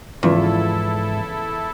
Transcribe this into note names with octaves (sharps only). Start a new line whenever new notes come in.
E2 G#2 C#3 F3 E4 F4 A4 E5